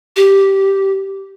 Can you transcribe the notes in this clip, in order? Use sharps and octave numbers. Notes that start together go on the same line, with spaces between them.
G4